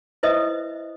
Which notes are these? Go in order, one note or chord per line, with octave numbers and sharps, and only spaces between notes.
E4 B4 C5 D#5 E5 D#6